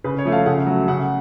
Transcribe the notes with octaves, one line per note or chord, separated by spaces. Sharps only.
C#3 B4
C#5
F3 A3
F5
C#3 F#5
F#3 A3
C#3 F#5